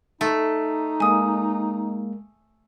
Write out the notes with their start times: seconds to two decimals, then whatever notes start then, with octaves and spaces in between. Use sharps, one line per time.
0.21 A3 D#4
1.00 G#3 A#3 G#5 D#6